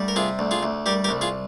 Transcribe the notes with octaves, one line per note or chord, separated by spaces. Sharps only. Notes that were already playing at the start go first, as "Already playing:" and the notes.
Already playing: D2 G3
A#4
C3 F4 G#4
D2
F4 G#4
D2
G3 G4 A#4
G4 A#4
C2
F4 G#4